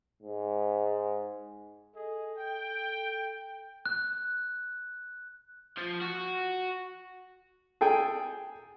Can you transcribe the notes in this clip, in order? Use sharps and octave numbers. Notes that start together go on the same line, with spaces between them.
G#2
G#4 A4 D#5
G5
F#6
F3
F#4
G#4 A4 G5 G#5